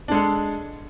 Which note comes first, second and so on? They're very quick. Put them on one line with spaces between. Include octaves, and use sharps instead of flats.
D4 G#3 A4